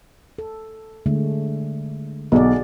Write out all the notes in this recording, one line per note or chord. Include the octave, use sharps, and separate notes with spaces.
A4
D3 G#3 A3
B1 F#4 G#4 D5